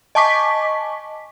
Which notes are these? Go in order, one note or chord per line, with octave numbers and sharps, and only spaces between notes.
D#5 G#5 A5 C#6 D6 B6